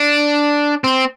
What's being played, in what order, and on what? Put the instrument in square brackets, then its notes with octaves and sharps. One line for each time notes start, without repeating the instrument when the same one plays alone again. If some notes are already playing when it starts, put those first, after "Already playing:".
Already playing: [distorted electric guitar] D4
C4